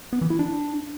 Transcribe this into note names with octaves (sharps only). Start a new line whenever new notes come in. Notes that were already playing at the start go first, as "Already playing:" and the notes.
B3
E3
E4
D4